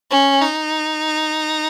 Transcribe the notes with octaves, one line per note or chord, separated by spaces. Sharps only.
C#4
D#4